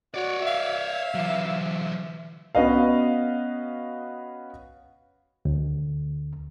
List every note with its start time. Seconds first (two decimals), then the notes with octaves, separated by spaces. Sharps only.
0.14 F#4 C#5 D5
0.47 E5 F5
1.14 E3 F#3
2.55 B3 C#4 F#4 B4 D#5 F5
5.45 D2